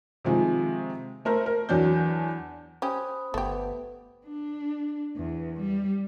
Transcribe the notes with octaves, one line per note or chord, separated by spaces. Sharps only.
C3 D#3 F3 G#3
A3 A#4 C5
A#4
E2 F#3 D4 G6
C#4 G4 C5 B5 D#6
G1 A3 B3 G4
D4
E2
G3